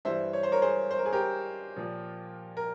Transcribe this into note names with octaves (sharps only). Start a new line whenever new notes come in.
G2 E3 G3 C5 E5
C#5
C5
A#4 C#5
G#4 C5
C5
A#4
G#4
G4 A#4
A#2 F3
A#4